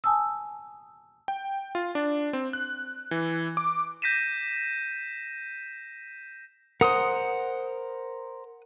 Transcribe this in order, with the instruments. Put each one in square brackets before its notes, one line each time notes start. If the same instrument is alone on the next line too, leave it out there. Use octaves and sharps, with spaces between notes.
[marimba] G#5 A5 D#6 E6
[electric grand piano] G5
F4
D4
C4
F#6
E3
D6
[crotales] G6 A#6 B6 D#7 E7
[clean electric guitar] A#4 C5 [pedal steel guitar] F#5 D#6